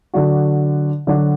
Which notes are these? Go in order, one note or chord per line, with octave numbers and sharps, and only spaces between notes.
D3 F#3 D4 F#4
D3 F#3 D4 F#4